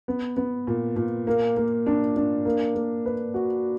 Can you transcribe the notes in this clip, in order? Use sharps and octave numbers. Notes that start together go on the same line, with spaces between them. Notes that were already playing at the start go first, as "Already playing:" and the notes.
B3
B3
A#2
A#2
A#3
A#3
D4
D4
A#3
A#3
B4
F#4